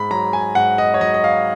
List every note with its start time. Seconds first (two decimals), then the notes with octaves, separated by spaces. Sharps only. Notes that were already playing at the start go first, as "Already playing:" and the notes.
Already playing: G#2 B5
0.11 F#3 A#5
0.33 G#5
0.55 G#2 F#5
0.78 D#5
0.94 C#5
1.01 F#3 D#5
1.14 D#5
1.24 F5